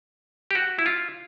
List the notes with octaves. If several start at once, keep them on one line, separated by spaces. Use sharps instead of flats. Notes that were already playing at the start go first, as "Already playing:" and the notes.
G4
F#4
E4
F4